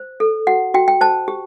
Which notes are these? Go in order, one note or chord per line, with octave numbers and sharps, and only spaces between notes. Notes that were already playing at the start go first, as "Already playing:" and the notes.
Already playing: C5
A4
F#4 F#5
F#4 G5
G5
C5 A5
G4